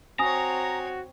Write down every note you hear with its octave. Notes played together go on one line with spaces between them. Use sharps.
C4 F#4 C#5 G#5 A#5 D#6